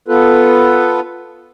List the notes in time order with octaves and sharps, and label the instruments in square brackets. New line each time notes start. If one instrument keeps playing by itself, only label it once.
[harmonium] B3 F4 A4 B4